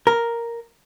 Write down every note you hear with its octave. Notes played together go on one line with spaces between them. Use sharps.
A#4